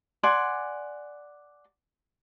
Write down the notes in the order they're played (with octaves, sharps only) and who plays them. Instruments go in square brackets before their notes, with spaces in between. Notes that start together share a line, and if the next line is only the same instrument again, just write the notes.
[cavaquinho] D5 F#5 G#5 C6